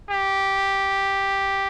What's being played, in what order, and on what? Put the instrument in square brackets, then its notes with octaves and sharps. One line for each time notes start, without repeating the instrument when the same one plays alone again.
[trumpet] G4